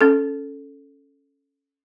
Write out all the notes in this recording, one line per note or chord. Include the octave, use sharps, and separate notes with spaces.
C#4 A4